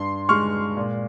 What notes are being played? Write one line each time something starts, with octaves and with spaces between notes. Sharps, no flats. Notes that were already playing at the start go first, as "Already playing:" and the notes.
Already playing: G2 C6
G#3 C#6 F6
A#2